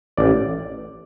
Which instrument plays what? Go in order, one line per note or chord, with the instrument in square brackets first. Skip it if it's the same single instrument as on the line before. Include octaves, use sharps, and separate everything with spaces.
[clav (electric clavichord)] A1 D5